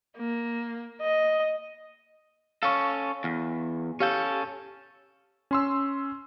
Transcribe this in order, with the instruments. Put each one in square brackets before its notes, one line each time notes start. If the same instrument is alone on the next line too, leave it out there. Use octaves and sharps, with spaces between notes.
[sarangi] A#3
D#5
[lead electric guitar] C#4 A4 [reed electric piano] F5 C#6
[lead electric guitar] E2
[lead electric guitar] C#4 A4 [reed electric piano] G4 F5 G6
[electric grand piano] C#4 C6 E6